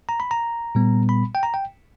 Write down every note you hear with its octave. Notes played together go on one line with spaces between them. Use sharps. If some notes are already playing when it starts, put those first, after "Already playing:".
A#5
B5
A#5
A#2 G3 B3
B5
G5
A#5
G5